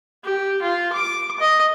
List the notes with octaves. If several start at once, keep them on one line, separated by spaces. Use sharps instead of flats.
G4
F4
D6
D#5